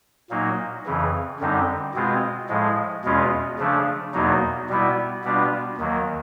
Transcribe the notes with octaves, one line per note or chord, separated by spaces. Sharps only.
A#2 F#3 A#3 D#4
F2 C#3 E3
F#2 D3 G3 C4 D#4
B2 G#3 C4 F4
A2 F3 G#3
E2 B2 G#3 C#4 F4
C#3 F3 A3 D4
E2 B2 F#3 A#3 D#4
B2 G3 B3 E4
B2 G3 B3 D4 F4
D#2 D#3 F#3 A#3